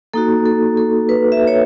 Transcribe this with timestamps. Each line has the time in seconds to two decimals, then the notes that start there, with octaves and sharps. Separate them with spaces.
0.14 A#3 D#4 F#4 A4
0.45 A4
0.77 A4
1.09 B4
1.32 E5
1.47 C#5